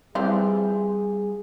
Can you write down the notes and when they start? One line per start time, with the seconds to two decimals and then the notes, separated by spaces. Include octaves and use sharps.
0.15 E3 F3 G3 C4 G#4